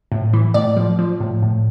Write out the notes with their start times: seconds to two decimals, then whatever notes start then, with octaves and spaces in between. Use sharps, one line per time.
0.12 A2
0.33 E3
0.54 A2 D5
0.77 F3
0.99 F3
1.21 A2
1.42 A2